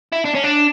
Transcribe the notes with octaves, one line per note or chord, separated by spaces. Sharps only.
E4
D4
C#4
D4